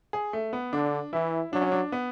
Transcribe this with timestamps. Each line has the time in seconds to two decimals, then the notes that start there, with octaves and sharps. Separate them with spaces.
0.13 G#4
0.33 A3
0.53 B3
0.72 D3 D4
1.13 E3 E4
1.53 F#3 D4
1.62 C#4
1.72 D4
1.92 B3